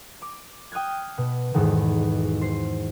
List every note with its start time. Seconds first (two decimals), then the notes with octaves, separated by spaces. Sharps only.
0.22 D6
0.72 G5 D#6 F6 F#6 G#6
1.18 B2
1.54 B1 E2 G#2 B2 D#3
2.41 C5 C7